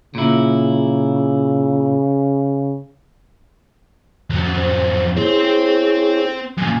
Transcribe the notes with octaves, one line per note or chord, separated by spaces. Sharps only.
A#2 C#3 E4
F2 F#3
C5
C4 E4 G#4 C5 C#5
F#2 A#2 G#5